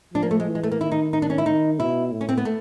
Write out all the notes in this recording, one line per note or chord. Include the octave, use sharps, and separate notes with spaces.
F3 D4
A#3
A3
G#3
E3
G#3
A3
A#3
D#3 E4
D#4
D#4
D4
C#4
E4
D#3 D#4
B2 E4
A2
C#4
C4
B3
A3